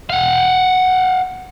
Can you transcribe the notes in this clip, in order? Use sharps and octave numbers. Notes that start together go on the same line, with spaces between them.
F5 F#5